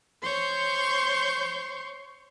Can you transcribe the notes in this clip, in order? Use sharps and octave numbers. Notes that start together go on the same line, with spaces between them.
C5 C#5 C6 C#6 G6